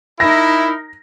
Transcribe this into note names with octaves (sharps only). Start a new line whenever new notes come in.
D#4 E4 A#4 A#6